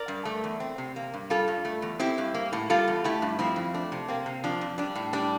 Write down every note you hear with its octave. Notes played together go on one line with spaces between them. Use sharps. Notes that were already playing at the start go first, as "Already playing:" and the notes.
Already playing: A#4 D5
G2
A3
E2
C4
C3
A#3
G2
G3 F4 A4
G2
A3
E2
C4 E4 G4
G2
A#3
A2
G3 F4 A4
E2
A3 E4 G4
G2
F3 C4 E4
F2
A3 D4
C3
A#3 C4
C3
F3 D4
F2
G3 D4
A2
G3 D4